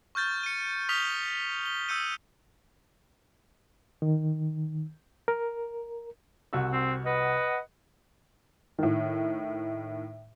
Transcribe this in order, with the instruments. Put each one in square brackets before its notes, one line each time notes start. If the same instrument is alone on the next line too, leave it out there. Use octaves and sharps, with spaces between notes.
[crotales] C#6 F6 G6 A6
C#7 D#7
C#6 D#6 F6 B6 F7 G7
G7
D#6 E6 G6 C#7 D#7
[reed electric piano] D#3
A#4
[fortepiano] C2 F#4 E6
[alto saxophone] C4
[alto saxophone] B4 [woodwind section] D#5 F#5
[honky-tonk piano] A2 D#3